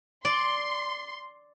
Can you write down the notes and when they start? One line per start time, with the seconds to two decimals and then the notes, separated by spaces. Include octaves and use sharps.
0.25 D5 C6